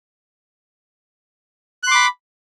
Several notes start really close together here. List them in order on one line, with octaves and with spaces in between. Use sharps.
F#6 C6 D6 B5